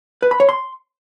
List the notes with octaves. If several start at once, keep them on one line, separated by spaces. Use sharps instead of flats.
B4
B5
C#5
C6